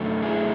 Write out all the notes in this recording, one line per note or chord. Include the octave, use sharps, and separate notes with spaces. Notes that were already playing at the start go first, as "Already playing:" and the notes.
Already playing: F#2 D3 A3
E4 G#4